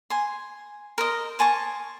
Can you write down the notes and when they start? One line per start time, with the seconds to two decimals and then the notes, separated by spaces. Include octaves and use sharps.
0.10 G#5 C6
0.98 A#4 C5 D#5
1.39 C5 G#5 A5 C#6